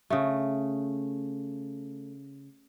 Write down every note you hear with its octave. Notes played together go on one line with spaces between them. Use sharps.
C#3 A3